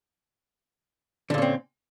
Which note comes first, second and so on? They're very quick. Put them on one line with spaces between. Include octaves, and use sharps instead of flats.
D3 A#2 C#4 C4